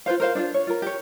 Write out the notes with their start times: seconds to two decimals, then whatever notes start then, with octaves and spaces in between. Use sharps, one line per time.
0.06 F4 B4 C5 F5
0.20 A#4 C5 F5
0.35 D4 E4 F4
0.54 C#5
0.67 F4 A#4
0.82 G4 C#5